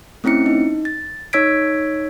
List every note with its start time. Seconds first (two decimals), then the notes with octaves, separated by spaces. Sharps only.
0.24 A3 C4 C#4 E4 C#7
0.46 D#4
0.85 A6
1.33 D#4 C#5 E6 G#6 B6 D7